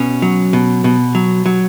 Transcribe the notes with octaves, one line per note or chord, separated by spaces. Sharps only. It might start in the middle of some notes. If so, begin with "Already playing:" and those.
Already playing: B2 C#4
F#3
B2
B2
F#3
F#3